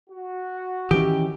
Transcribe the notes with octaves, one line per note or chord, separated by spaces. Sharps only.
F#4
D#3 E3 C#4 G4